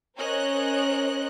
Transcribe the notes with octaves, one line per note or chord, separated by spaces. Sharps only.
C#4 A#4 C5 C#5 D#5 F#6